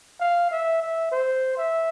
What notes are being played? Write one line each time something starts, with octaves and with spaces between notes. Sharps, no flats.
F5
E5
E5
C5
E5